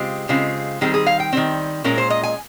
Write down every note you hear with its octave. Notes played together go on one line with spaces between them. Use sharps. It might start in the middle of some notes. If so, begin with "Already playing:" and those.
Already playing: C#3 G#3 C4 F4 G4
C#3 G#3 C4 F4
D#3 G3 C4 G#4
G#4
F5
G5
D#3 G3 C4
A#2 G#3 C#4 A#4
C5
D#5
G#5